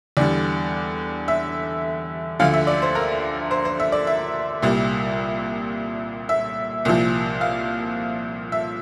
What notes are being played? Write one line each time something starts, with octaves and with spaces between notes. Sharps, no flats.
E2 D3 G3 D5
E5
D2 D3 F3 F5
E5
D5
C5
A#4
C5
C5
E5
D5
E5
C2 A#2 G3
E5
C2 A#2 F3
F5
E5